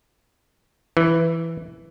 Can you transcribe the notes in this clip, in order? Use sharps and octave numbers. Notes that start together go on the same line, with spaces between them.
E3